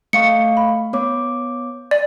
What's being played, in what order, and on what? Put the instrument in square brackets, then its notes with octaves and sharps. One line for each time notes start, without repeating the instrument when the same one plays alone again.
[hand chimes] A3 F5 C#6 [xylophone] C#7
[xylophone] B5
[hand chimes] B3 C#5 D6
[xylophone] D5